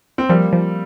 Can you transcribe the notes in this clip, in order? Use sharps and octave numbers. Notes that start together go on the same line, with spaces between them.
C4
F3 G3 A#3
F3